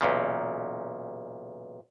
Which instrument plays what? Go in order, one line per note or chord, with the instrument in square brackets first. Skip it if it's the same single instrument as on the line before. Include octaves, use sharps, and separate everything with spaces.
[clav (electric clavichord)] B1 E2 A#2 C#3